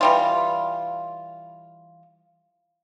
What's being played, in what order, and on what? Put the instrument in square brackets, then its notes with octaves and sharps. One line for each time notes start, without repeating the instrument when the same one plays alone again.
[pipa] E3 G3 F4